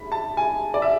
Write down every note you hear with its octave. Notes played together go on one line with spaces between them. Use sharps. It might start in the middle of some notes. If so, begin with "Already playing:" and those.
Already playing: B5
A5
G#5
D5
E5